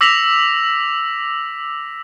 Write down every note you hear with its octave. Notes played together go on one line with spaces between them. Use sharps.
D6 E6 A#6 B6 F7 F#7